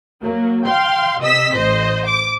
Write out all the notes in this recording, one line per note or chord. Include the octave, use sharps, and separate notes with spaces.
F#3 A#3
F5 G5 C6
C3 D#5 E6 B6
A1 C5 D#5
D6